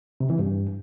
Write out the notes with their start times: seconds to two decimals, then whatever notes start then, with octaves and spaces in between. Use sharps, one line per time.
0.20 C3
0.30 E3
0.39 G2